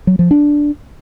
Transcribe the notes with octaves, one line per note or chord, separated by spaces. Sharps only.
F#3
F3
D4